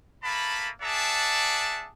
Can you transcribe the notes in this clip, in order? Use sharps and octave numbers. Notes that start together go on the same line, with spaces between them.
A3 A#3 A5 B5
D4 G#4 D5 E5 F#5 A5